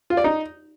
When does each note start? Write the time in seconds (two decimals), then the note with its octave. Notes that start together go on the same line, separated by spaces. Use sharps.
0.10 F4
0.17 D5
0.24 D#4